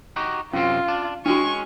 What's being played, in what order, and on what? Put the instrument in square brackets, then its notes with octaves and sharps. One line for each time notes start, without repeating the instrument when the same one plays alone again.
[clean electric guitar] D#4 F#4 G4
[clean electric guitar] F#2 C3 C4 [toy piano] C#4 [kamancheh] F4
[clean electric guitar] D4
[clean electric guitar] G#3 C#4 [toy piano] D4 F#4 [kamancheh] C#6